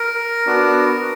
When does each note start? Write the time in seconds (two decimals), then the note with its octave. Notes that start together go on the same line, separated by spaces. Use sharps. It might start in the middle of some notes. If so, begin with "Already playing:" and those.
Already playing: A#4
0.46 B3 D4 F#4